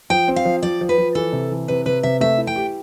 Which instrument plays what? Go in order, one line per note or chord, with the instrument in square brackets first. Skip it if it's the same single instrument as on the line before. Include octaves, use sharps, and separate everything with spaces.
[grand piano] F3 [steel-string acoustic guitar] G5
[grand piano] C4
[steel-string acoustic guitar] F5
[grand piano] F3
[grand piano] F3 [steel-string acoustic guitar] D5
[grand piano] F3
[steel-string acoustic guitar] B4
[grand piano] F3
[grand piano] E3 [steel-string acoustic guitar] A4
[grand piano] C3
E3
[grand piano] C3 [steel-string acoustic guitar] B4
[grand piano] C3 [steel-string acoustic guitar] B4
[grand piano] C3 [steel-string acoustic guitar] E5
[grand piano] A3 [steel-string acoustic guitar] E5
[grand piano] E4
[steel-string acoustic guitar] G5
[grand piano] G4